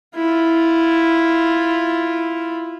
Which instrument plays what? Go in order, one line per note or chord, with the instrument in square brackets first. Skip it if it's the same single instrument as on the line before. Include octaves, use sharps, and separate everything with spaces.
[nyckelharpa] E4 F4